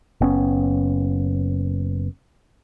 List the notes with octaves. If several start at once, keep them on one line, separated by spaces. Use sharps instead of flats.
F#1 B3 C#4